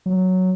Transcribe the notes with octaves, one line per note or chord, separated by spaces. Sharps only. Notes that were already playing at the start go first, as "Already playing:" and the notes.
F#3